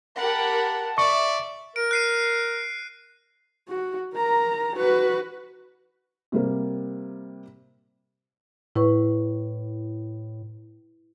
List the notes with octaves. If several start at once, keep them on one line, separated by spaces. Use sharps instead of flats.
G4 A#4 F#5 A5 B5
D5 E5 C#6
A#4 D7
F#6 C7 D#7
F#4
A#4 A#5
F#4 B4
C3 G3 A#3
A2 E4 B4 C#6